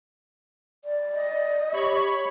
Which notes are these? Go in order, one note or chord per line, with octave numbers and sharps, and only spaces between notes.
D5
D#5
G4 C#5 B5 C#6